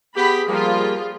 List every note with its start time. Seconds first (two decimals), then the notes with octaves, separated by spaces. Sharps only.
0.16 B3 G4 G#4 B5 B6
0.48 F3 G3 A#3 F4